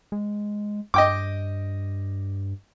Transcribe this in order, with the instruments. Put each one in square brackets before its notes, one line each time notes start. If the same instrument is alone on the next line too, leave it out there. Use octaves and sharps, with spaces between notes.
[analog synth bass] G#3
[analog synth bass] G2 [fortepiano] D#5 G5 D6